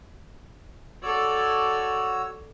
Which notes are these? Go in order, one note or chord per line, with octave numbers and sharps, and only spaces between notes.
F#4 A4 C#5 D5 E6